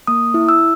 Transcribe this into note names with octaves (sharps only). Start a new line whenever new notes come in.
A#3 D#6
E4
E6